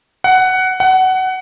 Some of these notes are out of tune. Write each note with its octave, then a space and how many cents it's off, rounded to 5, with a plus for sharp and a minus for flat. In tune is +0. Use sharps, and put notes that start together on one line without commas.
F#5 +10
F#5 +20